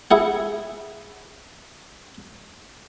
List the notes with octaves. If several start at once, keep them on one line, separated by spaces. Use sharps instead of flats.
E4 G#4 F#5